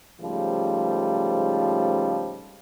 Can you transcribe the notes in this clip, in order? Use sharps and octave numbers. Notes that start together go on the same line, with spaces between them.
G#2 C#3 F3 G3 A3